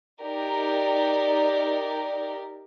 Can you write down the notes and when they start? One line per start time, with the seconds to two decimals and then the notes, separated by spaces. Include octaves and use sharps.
0.21 D#4 G4 A#4 D5